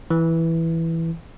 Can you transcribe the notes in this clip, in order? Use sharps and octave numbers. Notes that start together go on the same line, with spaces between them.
E3